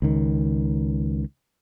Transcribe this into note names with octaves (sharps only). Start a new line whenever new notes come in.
C#2 D#3